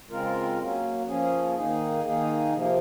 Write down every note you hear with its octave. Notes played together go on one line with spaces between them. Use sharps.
C#3 G#3 C4 F4 A#4
F#3 A#3 C#4
F3 A#3 C#4 G#4
D#3 A#3 D#4 G#4
D#3 A#3 D#4 G#4
C3 F3 A#3